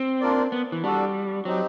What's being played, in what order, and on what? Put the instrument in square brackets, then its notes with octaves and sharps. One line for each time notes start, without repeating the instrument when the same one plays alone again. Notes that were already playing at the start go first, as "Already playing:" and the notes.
Already playing: [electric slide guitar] C4
[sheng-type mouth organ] A#3 D4 F4 A#4 D5
[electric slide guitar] B3
E3
[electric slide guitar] G3 [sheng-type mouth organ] D4 F#4 A4
[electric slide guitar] F#3 [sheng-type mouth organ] C4 D#4 G4